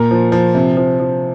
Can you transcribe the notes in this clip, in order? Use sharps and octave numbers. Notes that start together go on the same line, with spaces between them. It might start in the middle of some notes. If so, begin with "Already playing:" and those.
Already playing: A#2 A#4
F3
F3
C3
F3
F3